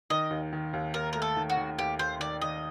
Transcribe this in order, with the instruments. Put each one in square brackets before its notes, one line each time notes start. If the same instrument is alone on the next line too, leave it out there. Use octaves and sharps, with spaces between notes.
[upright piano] D#3 [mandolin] D#5
[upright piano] D#2
D#3
D#2
[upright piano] D#2 [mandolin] A#4
[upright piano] A3 [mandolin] A#4
[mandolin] A4
[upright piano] D#3
[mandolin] F#4
[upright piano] D#3
[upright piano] D#2 [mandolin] G4
[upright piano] D#2 [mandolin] C5
[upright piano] D#3 [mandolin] D5
[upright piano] D#3 [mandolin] D#5